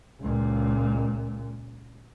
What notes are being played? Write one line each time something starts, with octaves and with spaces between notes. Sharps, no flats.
C#2 A#2